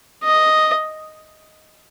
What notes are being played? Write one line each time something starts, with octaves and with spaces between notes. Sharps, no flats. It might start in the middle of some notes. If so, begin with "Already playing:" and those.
D#5